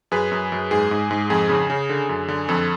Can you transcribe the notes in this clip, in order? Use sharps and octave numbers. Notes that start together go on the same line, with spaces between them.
F#2 G#4 B4
F#2
F#2
G#2 G#4
G#2
G#2
F2 G#4
C#3
C#3
D3
F#2
D3
F2 A4